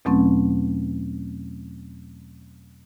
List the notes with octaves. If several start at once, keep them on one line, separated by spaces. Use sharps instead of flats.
E2 B2 F#3 A3 C4 C#4